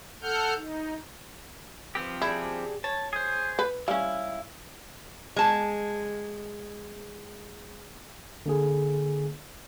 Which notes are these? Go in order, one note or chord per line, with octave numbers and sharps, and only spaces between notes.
A4 F#5 F6 G6
D#4
F3 C4 G4 B4
G3 D4 E4 G#4
C#5 A5
G#4 C5
B4
G3 C#4 E4 F5
G#3 A5
D3 A#3 G#4